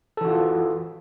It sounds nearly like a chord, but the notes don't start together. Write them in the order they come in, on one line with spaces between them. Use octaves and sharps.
A4 E3 F#4 F4